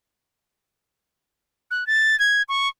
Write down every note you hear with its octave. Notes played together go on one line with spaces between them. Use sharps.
F#6
A6
G#6
C#6